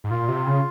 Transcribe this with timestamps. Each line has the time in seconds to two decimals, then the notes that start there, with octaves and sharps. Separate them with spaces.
0.04 G#2
0.10 A#2 F4
0.28 C3
0.47 C#3